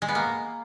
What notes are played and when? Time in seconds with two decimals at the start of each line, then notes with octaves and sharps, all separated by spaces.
0.02 G#3
0.08 B3
0.15 A#3